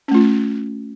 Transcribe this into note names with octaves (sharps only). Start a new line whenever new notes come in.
A3 C#4 F4